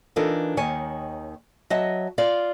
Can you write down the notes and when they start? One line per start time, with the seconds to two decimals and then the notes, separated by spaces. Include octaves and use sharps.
0.16 E3 D4 D#4 F4 A4 A#4
0.57 D#2 D#3 C#5 G#5
1.70 F#3 D#5 E5 A5
2.18 F4 D5 F5